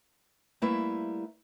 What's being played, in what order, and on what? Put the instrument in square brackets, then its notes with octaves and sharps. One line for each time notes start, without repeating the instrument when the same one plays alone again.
[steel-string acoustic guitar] G3 A3 A#3 E4 B4 E5